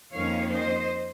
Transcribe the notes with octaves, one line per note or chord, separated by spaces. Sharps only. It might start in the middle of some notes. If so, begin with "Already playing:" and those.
F2 D#3 A#3 C#4 C#5 F5
C5 D#5